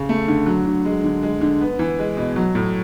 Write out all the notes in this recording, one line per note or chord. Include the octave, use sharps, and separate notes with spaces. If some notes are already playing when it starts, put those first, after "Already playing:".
Already playing: C#3
A3
D3
F#3
D3
G#3
D3
G#3
D3
B3
E3
G#3
B2
F#3
A2